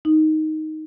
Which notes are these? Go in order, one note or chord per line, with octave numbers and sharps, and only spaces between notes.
D#4